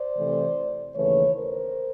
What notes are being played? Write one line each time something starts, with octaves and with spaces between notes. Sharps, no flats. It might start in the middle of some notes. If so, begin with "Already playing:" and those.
Already playing: C5 D5
C3 E3 A3
D#2 C#3 E3 A3 B4 C#5
A#4 C5